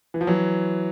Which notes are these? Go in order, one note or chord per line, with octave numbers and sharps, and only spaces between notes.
E3
F3
E3 F#3